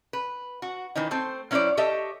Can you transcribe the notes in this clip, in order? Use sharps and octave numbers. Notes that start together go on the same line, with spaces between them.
B4
F#4
D#3 E3 C#4 D#4
A3 C4 C5
F#3 C#4 E4 B4 C5 D5
G4 A4 C#5 D#5 E5